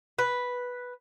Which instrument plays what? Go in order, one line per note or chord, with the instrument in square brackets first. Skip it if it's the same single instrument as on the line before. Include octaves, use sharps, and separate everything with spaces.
[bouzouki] B4